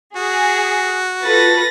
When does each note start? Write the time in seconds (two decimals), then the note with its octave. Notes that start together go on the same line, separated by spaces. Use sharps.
0.16 F#4 G#4
1.23 F4 A4 B4 A6 A#6